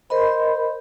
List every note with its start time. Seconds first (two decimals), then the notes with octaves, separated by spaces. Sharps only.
0.10 A#4 C5 D#5 B5